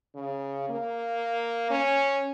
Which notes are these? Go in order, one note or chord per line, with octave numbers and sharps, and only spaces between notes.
C#3
A#3
C#4